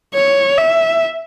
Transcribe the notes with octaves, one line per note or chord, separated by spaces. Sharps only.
C#5
E5